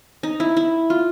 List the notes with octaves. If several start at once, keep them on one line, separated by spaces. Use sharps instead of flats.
D#4
E4
E4
F4